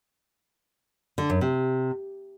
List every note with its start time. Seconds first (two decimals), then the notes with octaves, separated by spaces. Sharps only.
1.18 D3
1.30 F#2
1.41 C3